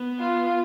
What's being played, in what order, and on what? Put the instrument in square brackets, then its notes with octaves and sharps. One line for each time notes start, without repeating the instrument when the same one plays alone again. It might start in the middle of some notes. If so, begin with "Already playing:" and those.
Already playing: [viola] B3
[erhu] F4